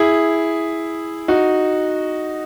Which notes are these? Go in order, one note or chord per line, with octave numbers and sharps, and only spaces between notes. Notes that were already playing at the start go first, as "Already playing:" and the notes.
Already playing: E4 G#4
D#4 F#4